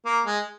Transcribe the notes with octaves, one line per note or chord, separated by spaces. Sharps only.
A#3
G#3